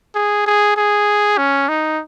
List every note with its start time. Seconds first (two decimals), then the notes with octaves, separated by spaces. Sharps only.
0.15 G#4
0.47 G#4
0.77 G#4
1.38 C#4
1.69 D#4